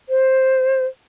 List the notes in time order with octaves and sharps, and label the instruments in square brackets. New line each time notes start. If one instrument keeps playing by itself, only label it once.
[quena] C5